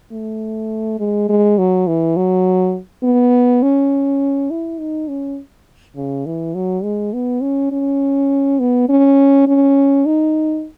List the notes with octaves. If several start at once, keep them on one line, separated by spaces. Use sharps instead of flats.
A3
G#3
G#3
F#3
E3
F#3
B3
C#4
E4
D#4
C#4
C#3
E3
F#3
G#3
B3
C#4
C#4
B3
C#4
C#4
D#4